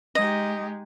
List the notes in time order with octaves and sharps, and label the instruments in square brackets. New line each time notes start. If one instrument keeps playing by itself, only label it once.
[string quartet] G#3 D#4 G4 [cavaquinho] D#5